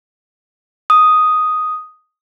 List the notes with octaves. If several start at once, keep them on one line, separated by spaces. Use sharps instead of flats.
D#6